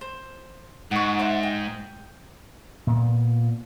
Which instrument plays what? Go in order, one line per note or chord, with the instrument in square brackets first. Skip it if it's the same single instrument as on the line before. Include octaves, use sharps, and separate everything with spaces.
[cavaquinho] C5
[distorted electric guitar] G#2 [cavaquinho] F#5 C#6
[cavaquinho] C5 E5 F#5
G5
[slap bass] A#2 B3